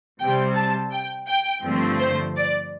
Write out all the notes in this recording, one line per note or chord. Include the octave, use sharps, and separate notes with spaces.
C3 G3 C4 G5
A5
G5
G5
G2 D3 F3 A3 C4
C5
D5